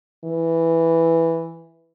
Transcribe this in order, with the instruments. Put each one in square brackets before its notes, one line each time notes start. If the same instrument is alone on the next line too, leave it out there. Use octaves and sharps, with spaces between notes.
[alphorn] E3